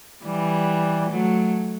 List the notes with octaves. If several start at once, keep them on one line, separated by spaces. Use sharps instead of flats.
E3 G3
F#3 A3